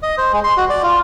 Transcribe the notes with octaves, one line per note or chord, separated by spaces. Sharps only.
D#5
C5
G#3
C6
F#4
D5
F4